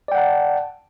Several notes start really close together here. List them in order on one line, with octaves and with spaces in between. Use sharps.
D5 G5 F#5 A5